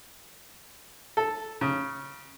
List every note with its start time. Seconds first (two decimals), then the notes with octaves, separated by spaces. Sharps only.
1.17 A4
1.61 C#3